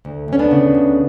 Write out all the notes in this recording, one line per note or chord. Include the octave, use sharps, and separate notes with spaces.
D2
D2 C#4
B3 D4
C#3
D2